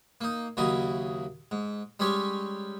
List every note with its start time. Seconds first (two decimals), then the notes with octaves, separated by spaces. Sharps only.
0.21 A#3 D#4
0.57 D#2 C#3 F#3 E4 D#5
1.51 G#2
2.00 G3 G#3 C#4 G4 C#5